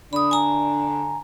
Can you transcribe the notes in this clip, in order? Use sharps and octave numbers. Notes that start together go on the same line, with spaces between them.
D3 D4 B5 D#6
G#5 A#5